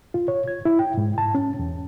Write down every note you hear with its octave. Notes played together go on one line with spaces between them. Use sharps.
F4
C#5
G#6
E4
G5
G#2
A5
C#4
E2